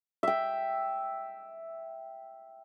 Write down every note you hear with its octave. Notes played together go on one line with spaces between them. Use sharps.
E5 G5